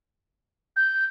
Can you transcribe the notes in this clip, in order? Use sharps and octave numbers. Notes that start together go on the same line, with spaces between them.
G6